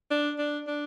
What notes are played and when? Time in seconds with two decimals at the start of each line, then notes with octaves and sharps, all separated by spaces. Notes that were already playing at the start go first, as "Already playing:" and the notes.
0.11 D4
0.38 D4
0.67 D4